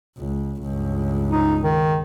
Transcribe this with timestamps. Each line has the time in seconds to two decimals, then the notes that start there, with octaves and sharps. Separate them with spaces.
0.18 C#2
0.62 C#2 G2
1.31 D#4
1.63 D#3